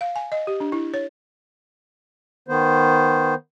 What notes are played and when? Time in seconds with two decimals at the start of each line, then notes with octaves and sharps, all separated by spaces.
0.01 F5
0.16 G#5
0.32 D#5
0.47 G4
0.60 D4
0.72 E4
0.94 C#5
2.48 D#3 B3 C5